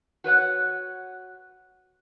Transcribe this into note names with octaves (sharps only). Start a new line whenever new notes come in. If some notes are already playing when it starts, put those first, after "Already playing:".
F#4 B4 C#5 F#5